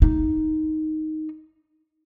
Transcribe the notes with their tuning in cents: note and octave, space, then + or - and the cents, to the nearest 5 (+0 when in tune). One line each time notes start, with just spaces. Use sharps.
D#4 +5